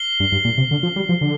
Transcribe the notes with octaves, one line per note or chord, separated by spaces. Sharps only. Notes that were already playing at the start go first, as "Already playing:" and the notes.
Already playing: F6 C7 G7
G2
G2
A#2
C3
D3
F3
G3
F3
D3